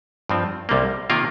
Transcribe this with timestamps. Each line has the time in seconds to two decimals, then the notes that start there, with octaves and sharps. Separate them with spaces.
0.29 G2 F3 C4
0.69 C2 C3 G3 A#3
1.10 C3 D#3 A#3 F4 A#4